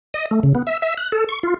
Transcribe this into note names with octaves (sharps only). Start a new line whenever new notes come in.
D#5
A3
C#3
B3
E5
E5
F#6
A4
C#6
F4